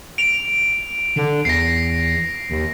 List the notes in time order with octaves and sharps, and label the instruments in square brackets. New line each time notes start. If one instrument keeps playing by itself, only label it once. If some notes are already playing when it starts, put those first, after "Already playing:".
[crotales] D7 F7
[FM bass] D3
[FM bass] E2 [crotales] A#6 C7
[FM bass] D#2